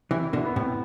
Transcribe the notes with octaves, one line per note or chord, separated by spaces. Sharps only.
C3 E3 E4
B2 D3
B3
A2 C3